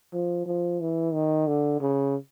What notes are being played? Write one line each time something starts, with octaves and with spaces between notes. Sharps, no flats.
F3
F3
E3
D#3
D3
C#3